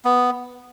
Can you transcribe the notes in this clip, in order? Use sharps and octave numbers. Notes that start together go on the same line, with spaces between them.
B3